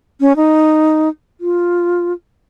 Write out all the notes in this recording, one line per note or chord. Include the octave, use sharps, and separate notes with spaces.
C#4
D#4
F4